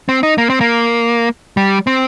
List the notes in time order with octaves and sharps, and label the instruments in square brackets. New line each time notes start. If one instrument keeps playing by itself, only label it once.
[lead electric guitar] C4
D#4
A#3
C4
A#3
G3
C4